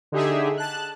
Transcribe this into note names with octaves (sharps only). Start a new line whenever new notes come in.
D3 D#4 G4 G#4 E5
A5 F#6